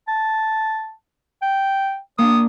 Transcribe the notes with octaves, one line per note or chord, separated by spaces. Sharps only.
A5
G5
A#3 D4 D#6